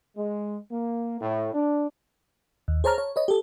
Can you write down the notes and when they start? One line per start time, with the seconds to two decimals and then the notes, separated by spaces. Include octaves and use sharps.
0.16 G#3
0.70 A#3
1.21 A2
1.54 D4
2.68 D#2
2.84 G#4 C5 C#5 A5 A#5 F6
2.98 C#5
3.16 B4 C#5 D#5
3.28 G4 A4